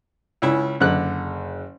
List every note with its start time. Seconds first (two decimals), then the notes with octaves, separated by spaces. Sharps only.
0.42 C#2 C#4 E4
0.80 F#1 D3 F#6